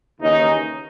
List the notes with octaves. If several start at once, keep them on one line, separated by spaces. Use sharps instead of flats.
D#2 C#3 E3 C#4 D#4